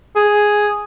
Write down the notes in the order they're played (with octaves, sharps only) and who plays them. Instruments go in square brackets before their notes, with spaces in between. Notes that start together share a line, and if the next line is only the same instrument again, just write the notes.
[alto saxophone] G#4